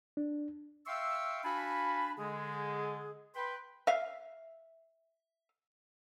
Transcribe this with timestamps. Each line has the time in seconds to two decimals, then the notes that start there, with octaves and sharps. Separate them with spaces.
0.17 D4
0.87 E5 F5 G5 C6 C#6 E6
1.44 D4 F#4 F5 G#5 A5 B5
2.18 D3 G#3 G#4
3.35 B4 G5 B5 C6
3.87 E5 F5